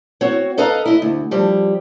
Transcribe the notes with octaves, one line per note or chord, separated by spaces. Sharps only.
C4 F#4 C#5
A4 B4 D#5 F5 A#5
E4 D#5
D2
F3 G3